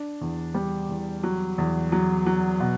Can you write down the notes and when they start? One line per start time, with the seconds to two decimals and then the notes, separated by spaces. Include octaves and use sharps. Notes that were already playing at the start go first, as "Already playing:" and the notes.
Already playing: D4
0.21 E2
0.54 G3
0.89 E2
1.23 F#3
1.58 E2
1.92 F#3
2.26 F#3
2.60 B2